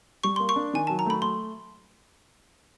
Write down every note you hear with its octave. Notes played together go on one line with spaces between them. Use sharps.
G3 C#6
A#3 C6
C#6
D4
D#3 G#5
F#3 A5
A#5
A3 B5
A3 C6